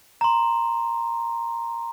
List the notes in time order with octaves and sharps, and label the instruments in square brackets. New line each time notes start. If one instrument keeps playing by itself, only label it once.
[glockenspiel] A#5 C6